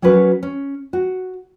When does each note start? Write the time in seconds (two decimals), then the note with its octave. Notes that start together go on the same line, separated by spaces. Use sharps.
0.02 F#3 C#4 F#4 A#4 B4
0.43 C#4
0.93 F#4